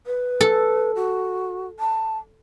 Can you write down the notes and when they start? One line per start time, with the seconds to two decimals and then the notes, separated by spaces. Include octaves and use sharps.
0.07 B4
0.41 A4
0.96 F#4
1.80 A5